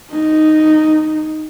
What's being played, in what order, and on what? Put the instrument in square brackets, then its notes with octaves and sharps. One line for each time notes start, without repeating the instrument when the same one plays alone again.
[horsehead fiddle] D#4